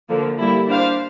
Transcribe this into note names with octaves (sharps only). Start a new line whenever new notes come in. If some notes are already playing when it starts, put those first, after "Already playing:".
D3 F3 A#3
G3 A#3 E4
D4 G4 C5 F5